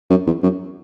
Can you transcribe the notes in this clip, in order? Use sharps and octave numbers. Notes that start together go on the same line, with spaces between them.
F#2
E2
F#2